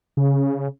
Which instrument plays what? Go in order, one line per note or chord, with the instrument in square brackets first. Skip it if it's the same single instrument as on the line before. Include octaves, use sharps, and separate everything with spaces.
[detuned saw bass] C#3